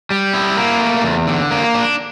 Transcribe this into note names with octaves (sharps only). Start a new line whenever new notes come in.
G3
E4
A#3
A3
E2
D3
A#3
D4